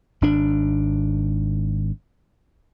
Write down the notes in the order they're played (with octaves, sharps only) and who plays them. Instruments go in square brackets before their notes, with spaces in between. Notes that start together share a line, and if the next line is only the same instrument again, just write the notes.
[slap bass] G#1 D4